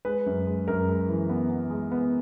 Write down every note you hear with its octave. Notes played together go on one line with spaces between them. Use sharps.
G#3 B4
F#2
G#3
F#2 A#4
G#3
E3
B3
B3
G#3
B3